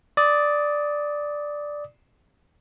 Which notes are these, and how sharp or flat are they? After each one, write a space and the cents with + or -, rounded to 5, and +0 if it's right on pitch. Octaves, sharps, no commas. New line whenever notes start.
D5 +0 D#6 +20